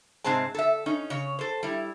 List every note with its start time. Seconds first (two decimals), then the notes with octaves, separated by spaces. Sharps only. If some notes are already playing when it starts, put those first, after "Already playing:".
0.24 G#2 C3 C4 G#4 C5 A5
0.54 A4 E5
0.86 C#4 D#4
1.10 C#3 C#5
1.39 A4 C5
1.63 G3 E4